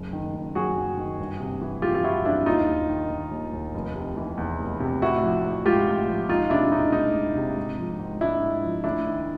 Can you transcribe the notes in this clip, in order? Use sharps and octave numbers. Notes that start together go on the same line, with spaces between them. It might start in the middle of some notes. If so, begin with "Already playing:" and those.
Already playing: F#1
D#3
F#1
F#2 F#4 G#4
F#1
D#3
G1
C3
E3
F2 F4 G4
F4
G1 E4 F#4
C3 D4 E4
D#2 D#4 F4
D#2
D#3
D#3
D#2
D#2
F1
C3
E3
E2
F1
C3
A1 E4 F#4
F3
A1
G#2 F4 G4
A1
F3
E1 D#4 F4
C3 D4 E4
E1 D#4
D2 D#4
E1
C3
G#1
F3
G#1
G#2 D4 E4
G#1
F3
D2 D4 E4
D#3